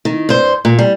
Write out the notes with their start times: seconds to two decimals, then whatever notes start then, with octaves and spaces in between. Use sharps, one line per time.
0.05 D#3
0.29 G2 C5
0.65 A#2
0.79 G3